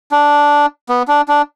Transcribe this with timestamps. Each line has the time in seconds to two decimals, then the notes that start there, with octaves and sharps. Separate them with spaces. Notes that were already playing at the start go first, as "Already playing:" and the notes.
0.12 D4
0.89 B3
1.08 D4
1.28 D4